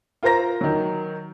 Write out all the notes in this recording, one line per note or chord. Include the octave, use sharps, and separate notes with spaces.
F4 A#4 C5 A#5 A#6
D#3 F#3